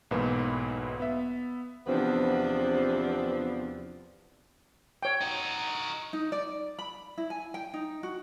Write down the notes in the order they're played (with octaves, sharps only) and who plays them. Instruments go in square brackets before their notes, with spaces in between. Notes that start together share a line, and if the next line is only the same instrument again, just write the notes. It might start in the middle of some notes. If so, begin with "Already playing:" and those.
[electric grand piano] B1 G#2 B2 E3 A#3 B4
B3 E5
[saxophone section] E2 C3 F3 B3 C4 D4
[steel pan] C#5 G5
[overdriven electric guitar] D#4 F#4
[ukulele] D#4
D5
B5
E4
G#5
G5
D#4
F#4